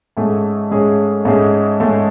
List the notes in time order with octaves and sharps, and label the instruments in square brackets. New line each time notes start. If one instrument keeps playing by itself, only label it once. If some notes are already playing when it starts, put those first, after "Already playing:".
[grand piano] G#2 G#3 C#4 G#4 [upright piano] A3
[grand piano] G#2 G#3 C#4 G#4
[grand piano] G#2 G#3 C#4 G#4 [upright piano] A3
[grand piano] G#2 G#3 C#4 G#4 [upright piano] A3